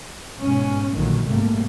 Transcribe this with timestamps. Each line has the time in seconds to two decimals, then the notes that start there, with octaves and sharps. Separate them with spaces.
0.41 G#2 B2 C#4
0.92 A#1 A#2 D3 D#3 F#3
1.27 G#2 C3 G3 A3 A#3